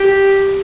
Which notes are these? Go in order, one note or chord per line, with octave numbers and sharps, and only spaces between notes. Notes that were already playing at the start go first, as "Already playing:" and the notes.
Already playing: G4